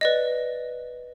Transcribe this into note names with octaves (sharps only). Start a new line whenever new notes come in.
B4 D5 D#5